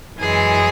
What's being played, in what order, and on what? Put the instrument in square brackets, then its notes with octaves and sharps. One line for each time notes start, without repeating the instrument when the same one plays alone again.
[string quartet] F#2 E3 G#3 G#4